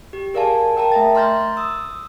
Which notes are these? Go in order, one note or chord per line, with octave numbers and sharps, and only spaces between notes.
G4
G#4 A#4 D5 F5 G#5 A5
A#4 G5 A5 A#5
A3 E5 A6
A#5 C6 F6 G6 A6 A#6
D#6 E6